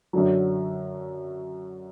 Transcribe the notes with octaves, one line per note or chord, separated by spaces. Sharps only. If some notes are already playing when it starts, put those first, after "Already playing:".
F#2 D3 F#3